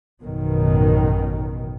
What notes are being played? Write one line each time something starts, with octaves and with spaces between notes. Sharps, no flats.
A1 F#2 B2 D#3